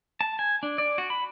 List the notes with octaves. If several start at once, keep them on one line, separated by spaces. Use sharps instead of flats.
A5
G#5
D4
D5
F#4
B5